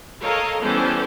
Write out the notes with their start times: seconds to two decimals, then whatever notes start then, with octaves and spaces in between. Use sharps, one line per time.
0.21 A4 A#4 C#5 D#5 F5
0.62 E3 G3 B3 C#4 A4 C5